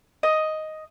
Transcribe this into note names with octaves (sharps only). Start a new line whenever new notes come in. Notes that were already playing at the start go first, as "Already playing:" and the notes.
D#5